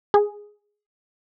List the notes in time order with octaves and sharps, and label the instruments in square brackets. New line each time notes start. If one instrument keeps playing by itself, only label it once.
[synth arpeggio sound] G#4